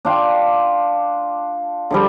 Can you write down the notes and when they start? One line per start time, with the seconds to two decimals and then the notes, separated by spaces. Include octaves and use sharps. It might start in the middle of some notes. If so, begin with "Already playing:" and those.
0.05 D4 F4 G5
1.91 D3 F3 G3